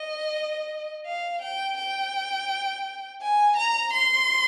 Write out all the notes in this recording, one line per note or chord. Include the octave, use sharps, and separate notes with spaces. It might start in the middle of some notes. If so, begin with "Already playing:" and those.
Already playing: D#5
F5
G5
G5
G#5
A#5
C6